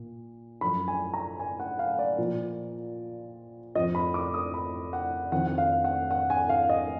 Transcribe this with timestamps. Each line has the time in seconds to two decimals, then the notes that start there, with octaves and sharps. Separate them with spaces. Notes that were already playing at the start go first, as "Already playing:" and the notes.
Already playing: A#2
0.61 F#2 F3 B5
0.88 G#5
1.14 A#5
1.40 G#5
1.60 F#5
1.79 F5
1.99 D5
2.18 A#2 F3
3.75 F2 F3 D#5
3.95 B5
4.14 D6
4.34 D#6
4.54 B5
4.93 F#5
5.32 F2 D#3 F#5
5.47 F#5
5.58 F5
5.84 F#5
6.11 F#5
6.30 G#5
6.49 F5
6.69 D#5